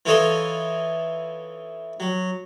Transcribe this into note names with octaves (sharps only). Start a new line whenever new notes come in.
E3 F4 A4 C#5 D#5 C6
F#3